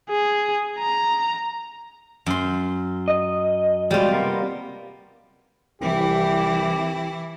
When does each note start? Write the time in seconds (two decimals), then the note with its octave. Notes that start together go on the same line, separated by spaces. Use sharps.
0.10 G#4
0.79 A#5
2.26 F#2 C6
3.08 D#5
3.91 B2 F3 G3 G#3 F4
4.12 C3 A#3 B3
5.82 C2 E3 E4 G4